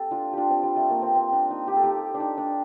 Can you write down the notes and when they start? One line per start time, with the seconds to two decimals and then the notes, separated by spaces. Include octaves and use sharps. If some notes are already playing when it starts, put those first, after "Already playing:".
Already playing: C4 G4 A4
0.11 D4 F4
0.33 D4 F4 G4
0.50 C4
0.63 G3
0.76 A3
0.90 A#3
1.02 C4
1.15 C4
1.33 D4
1.50 D#4
1.68 G4
1.76 A4
1.84 D#4 G4
2.14 D4
2.20 D#4
2.38 D4